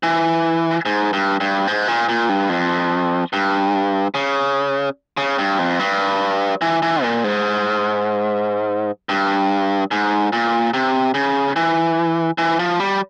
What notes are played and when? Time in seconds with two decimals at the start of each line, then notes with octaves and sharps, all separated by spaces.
0.03 E3
0.85 G#2
1.13 G2
1.40 G2
1.67 G#2
1.88 A#2
2.09 A#2
2.29 G2
2.49 F2
3.33 G2
4.14 C#3
5.17 C#3
5.38 G2
5.59 F2
5.80 G2
6.61 E3
6.82 E3
7.03 A#2
7.24 G#2
9.09 G2
9.91 G#2
10.32 A#2
10.74 C3
11.14 C#3
11.56 E3
12.38 E3
12.59 F3
12.80 G3